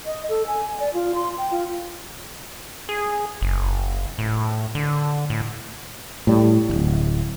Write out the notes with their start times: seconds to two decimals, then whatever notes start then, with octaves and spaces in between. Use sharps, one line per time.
0.06 D#5
0.29 A4
0.47 G#5
0.80 D5
0.94 F4
1.15 C6
1.38 G5
1.51 F4
2.89 G#4
3.41 F#1
4.18 A2
4.75 D3
5.30 A2
6.27 A2 G3
6.70 D1 G#1